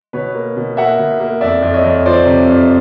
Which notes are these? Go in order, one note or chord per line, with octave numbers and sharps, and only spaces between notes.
B2 B4 C#5
A#3
B2
A#3 E5 F#5
B2
A#3
F2 D5 E5
F2
C#5 D#5
F2
F3 C5 D5
C3
F2